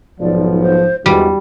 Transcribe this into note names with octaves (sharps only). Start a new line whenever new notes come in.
B1 G#2 F3 D5
C5
E2 G#2 G3 F#4